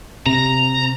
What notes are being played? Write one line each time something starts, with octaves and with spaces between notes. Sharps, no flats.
C3 A#5